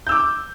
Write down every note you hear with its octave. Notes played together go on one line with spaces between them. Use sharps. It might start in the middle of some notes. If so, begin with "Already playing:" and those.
D6 E6 G6